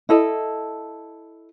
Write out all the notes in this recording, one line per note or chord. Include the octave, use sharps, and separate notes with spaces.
E4 A4 D#5